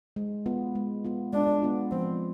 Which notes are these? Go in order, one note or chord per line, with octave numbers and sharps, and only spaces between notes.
G#3
B3 F4
G#3
B3 F4
G#3 D4
B3 F4
F3 C4